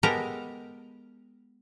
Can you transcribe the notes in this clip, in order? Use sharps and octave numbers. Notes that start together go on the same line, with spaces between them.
G#3 B3 G4 A4 A#4 A#5